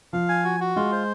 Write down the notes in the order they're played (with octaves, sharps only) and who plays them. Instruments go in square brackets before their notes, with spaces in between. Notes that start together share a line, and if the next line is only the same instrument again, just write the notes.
[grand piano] F3 [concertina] F5
[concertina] G#5
F#4
F#4
[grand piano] G#3 [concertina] F4
[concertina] C5